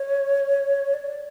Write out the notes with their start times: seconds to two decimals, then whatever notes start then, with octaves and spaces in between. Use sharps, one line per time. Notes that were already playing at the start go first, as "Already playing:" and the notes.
Already playing: C#5
0.94 D5